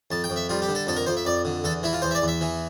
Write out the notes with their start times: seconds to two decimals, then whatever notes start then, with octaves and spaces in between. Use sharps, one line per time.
0.11 F2 A5
0.24 G5
0.30 F2
0.36 E5
0.49 G3 F4
0.62 G4
0.69 D3
0.75 A4
0.87 F2 A4
0.97 A#4
1.06 F2 C5
1.17 E5
1.25 F2 D5
1.45 D3
1.64 E2 A4
1.83 E3 E4
1.93 F4
2.02 E2 C5
2.11 E5
2.15 D5
2.22 E2
2.28 E5
2.41 E3